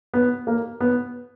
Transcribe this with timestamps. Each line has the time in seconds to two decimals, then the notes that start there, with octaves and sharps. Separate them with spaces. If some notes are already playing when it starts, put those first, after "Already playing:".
0.14 B3
0.47 A#3
0.80 B3